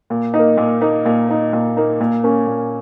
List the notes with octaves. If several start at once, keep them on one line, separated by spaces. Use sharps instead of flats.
A#2
D#4
A#3
A#2
A#3 D#4
A#2
A#3 D#4
A#2
A#3 D#4
A#2
A#3 C#4
A#2